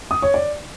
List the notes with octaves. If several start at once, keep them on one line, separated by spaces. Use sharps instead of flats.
D#6
C#5
D5